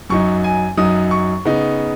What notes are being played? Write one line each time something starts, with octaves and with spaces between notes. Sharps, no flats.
F#2 F#3 D#4 C#6
G#5
F#2 F#3 D#4 D#6
C#6
C#3 B3 D#4